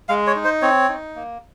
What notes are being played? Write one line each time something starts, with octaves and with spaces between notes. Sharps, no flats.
G#3 F5
C#5
D#4
C5
C4 C#5
D#4
A#3